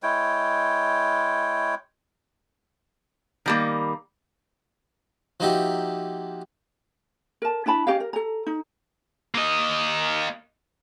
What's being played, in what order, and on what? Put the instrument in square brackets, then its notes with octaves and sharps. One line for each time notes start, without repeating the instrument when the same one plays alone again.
[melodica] G#3 E4 C#5 G5
[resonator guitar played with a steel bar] D#3 G3 A#3
[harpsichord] F3 A#3 D#4 F#4 G4 E5
[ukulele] A#4 A5
D4 E4 A5 B5
C#4 G4 D#5 F5
A#4
A4 A#5
D#4
[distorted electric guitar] A#3 D#5